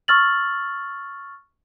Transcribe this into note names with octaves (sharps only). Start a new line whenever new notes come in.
C#6 E6 F6 A6 F#7